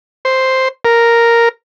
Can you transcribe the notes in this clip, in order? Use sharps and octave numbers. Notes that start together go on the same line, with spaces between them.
C5
A#4